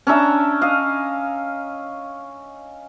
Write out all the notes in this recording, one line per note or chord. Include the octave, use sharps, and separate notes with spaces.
C#4 D4 E5 A#5
D#5 F5